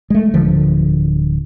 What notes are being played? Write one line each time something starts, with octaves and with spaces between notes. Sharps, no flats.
G#3 A3
D1 D3 F3